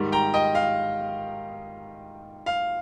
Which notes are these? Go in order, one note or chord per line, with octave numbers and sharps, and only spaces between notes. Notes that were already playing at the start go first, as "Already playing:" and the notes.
Already playing: G#2 D#3 G3
G5 A#5
D#5 G5
F5
F5